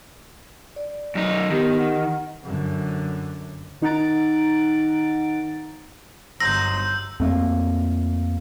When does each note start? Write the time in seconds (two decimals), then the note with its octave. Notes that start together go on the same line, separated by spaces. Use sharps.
0.76 D5
1.15 F#2 D#4
1.50 D#3 B3 D#4 G4
1.79 F#5
2.44 F#2 D3
3.82 D#3 D#4 F#5 A#5 A6 D7
6.40 G1 F#3 D#4 C5 E6 G6 A#6
7.20 F2 A3 A#3